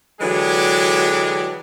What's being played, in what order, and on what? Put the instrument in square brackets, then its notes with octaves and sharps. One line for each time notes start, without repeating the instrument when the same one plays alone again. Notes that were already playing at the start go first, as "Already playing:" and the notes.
[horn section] D3 E3 F#3 G#3 D4 G4